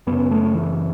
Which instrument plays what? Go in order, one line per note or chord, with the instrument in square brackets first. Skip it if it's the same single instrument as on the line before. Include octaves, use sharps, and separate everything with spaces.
[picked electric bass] F#2 C#3 B3
A3
E3